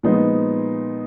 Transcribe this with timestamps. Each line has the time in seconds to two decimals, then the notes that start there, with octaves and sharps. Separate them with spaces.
0.03 A#2 F3 G#3 B3 D#4